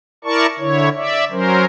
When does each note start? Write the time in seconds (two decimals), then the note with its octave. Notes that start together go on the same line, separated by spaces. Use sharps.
0.24 E4 A#4 D5 A5 C#6
0.59 D3 E4 C#5
0.96 D5 E5
1.31 F#3 C#4 A#4 C5